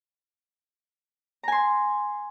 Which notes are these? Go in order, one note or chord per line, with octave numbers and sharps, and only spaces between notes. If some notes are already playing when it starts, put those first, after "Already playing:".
G#5 A#5 C6